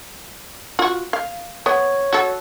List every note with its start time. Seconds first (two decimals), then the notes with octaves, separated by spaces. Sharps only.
0.79 F4 F#4
1.13 F5
1.66 B3 C#5
2.13 F#4 A4